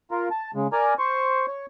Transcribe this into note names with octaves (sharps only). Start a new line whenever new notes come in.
F4 A#4
A5
C#3 G#3
A#4 D5 G#5 A#5
C5 C#6
C#5